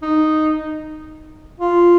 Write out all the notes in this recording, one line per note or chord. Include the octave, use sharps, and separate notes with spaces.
D#4
F4